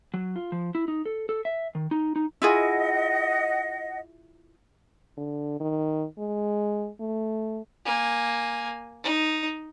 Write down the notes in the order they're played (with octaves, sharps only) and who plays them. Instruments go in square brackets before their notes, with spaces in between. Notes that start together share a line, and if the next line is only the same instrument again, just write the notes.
[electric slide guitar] F#3
F4
F3
E4
D#4
A4
A4
E5
D#3
D#4
D#4
[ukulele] E4 F4 G#4 [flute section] D#5 F#5
[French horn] D3
D#3
G#3
A3
[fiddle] A#3 G#5
D#4